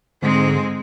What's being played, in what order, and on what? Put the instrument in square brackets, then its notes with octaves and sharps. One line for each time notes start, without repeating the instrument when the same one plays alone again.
[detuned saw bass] G#2 [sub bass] D3 [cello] G#3 C4